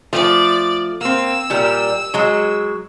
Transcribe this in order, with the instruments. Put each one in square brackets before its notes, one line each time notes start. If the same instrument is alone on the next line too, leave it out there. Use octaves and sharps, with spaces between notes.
[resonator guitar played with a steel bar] F3 A3 [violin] D5
[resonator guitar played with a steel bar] A#3 C4 [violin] E6
[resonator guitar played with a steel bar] A#2 G3 A#4
F#3 G#3